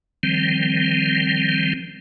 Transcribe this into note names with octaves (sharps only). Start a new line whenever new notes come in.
D#3 F3 G3 C4